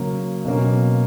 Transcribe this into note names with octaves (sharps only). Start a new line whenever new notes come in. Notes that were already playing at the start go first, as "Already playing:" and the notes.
Already playing: C#3 F#3 A#3 C#4
B2 F#3 A#3 C#4